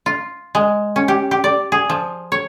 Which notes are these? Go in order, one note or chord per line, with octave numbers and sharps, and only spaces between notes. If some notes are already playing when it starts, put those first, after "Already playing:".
F4
G#3
C#4
G4
G4
D5
G#4
F3
C#5